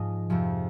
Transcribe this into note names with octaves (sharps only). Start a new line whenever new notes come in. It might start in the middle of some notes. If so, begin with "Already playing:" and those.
Already playing: G#2 F3 D#5
F2 C3 F3